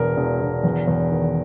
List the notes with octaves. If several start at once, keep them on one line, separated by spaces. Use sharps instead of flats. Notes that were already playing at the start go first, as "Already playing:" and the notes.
Already playing: E1 E2 A#4
E1
E1
E2
E2
D#3